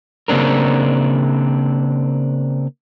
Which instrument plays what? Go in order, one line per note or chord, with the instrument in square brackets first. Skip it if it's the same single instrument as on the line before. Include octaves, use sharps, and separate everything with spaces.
[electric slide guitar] C#3 A#3 C4 D4 A#4